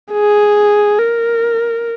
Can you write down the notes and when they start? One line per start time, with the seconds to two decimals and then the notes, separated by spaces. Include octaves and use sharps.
0.12 G#4
0.99 A#4